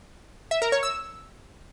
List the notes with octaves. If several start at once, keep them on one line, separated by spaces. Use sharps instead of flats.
E5
A#4
C#5
E6